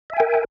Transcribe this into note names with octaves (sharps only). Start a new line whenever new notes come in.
A#4 E5 G5 G#5